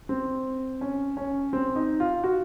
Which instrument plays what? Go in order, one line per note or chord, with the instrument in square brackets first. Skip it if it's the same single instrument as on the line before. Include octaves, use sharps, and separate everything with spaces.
[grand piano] C4
C#4
C#4
C4
D#4
F4
F#4